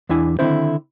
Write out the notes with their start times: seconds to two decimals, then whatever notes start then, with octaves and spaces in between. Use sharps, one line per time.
0.09 E2 D4 E4 G#5
0.39 D3 D#3 C4 D4 E4 C5